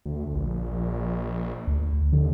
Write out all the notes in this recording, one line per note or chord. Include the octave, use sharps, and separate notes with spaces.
D2
A#1
D2
D#2 D3